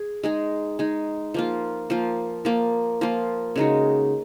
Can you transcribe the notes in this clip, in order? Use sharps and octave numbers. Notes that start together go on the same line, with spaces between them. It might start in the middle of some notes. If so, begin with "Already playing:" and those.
Already playing: G#4
G#3 D#4 G#4
G#3 D#4 G#4
F3 A#3 F4
F3 A#3 F4
F3 A#3 F4
F3 A#3 F4
C#3 G#3 D#4 F#4